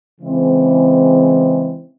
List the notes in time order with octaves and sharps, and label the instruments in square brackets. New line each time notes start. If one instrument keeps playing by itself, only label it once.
[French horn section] C#3 E3 G#3 C4